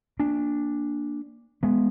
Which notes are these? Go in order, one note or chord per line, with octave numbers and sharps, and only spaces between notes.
A#3 D4
G#3 B3